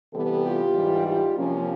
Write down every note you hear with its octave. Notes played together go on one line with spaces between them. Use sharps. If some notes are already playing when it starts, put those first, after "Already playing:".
C3 E3 G3 B3 G4 A4
F4 G4
G#2 E3 G3
F4 G4
C3 F3 A#3 C#4